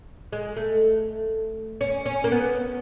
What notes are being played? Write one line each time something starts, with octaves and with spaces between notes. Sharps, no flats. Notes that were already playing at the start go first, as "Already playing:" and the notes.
G#3
A3
C#4
C#4
A#3
B3